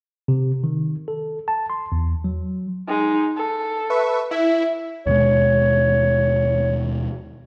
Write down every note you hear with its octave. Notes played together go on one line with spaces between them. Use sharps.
C3
D#3
A4
A5
C6
E2
F#3
G#3 D#4
A4
B4 E5 C#6
E4 E5
D#2 B2 G#3 C#5